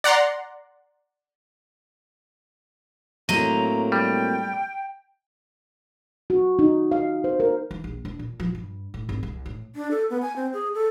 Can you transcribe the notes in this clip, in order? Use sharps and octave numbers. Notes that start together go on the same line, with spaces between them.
D5 F#5 A#5 C6
A2 F#3 A#3 C4 D#5 A#5
G3 G5
F#4
D#4
F5
C5
A#4
E3
A#1
D4
A#2
F3
G2
A2
G#1
C2
A2
D4
A4
B3
G#5
C4
G#4
A4